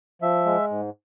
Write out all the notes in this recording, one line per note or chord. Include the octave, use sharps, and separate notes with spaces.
F3 E5
G#3
G#2